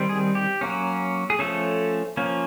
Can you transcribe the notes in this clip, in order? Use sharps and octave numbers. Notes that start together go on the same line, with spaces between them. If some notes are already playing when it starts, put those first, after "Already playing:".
Already playing: D#3 G3 C4
G#4
G4
F#3 A#3 C#4
G#4
F3 A3 C#4 A4
F3 A#3 C#4